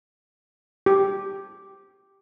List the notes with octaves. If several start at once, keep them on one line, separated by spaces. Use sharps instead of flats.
G4